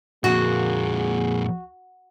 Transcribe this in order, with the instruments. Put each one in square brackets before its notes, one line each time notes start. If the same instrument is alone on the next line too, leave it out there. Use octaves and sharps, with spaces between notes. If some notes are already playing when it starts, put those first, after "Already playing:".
[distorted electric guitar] F2 A#2 [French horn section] A#3 G#4 [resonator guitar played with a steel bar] F#4